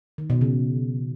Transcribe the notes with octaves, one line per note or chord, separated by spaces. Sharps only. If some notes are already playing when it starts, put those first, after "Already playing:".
D#3
B2
C#3